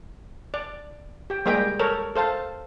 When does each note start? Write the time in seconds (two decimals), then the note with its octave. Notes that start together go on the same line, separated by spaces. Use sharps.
0.54 D5
1.30 G4 G5
1.46 G3 G#3 A#3 G#4 D#5 G5
1.79 A4 A#4 C#5
2.16 A4 C5 F5 A5